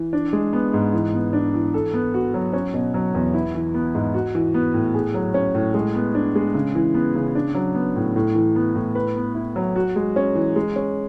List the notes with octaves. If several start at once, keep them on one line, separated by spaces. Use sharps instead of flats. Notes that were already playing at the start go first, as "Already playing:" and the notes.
Already playing: E3
D4
G#3
B3
G#2
E3
B3
D4
E3
A4
B3
F#4
F#3
C#4
B2
F#3
E2
E4
E3
B3
G#2
F#4
E3
B3
A2
G#4
F#3
C#4
A2
G#3
B3
D4
G#3
C#3
E3
B3
C#3
D4
F#3
B3
A2
A2
E3
B3
A2
B4
B3
E4
F#3
F#4
G#3
C#4
E3
G#3
C#4